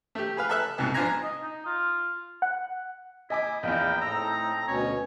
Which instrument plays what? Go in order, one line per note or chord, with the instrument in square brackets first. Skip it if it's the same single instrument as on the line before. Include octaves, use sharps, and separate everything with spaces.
[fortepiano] A3 G4
G#4 B4 F5
A4 E5 F#6
C2 G#2 B2
F3 D4 F4 G#5 A#5
[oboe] D#5
D#4
F4
[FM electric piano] F#5
[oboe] E4 [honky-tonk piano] D#5 G#5 D6
[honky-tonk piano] A#1 E2 [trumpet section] B3 D#4 F5 [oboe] G5
[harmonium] A2 [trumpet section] C4 D#4 A4 [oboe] A#5 [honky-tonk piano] E6
[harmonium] D2 B2 C#4 [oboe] C#5